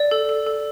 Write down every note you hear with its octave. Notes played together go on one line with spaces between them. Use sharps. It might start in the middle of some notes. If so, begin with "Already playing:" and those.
Already playing: D5
A4
A4
A4